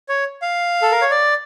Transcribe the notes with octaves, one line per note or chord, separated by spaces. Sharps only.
C#5
F5
A4
A#4
C#5
D5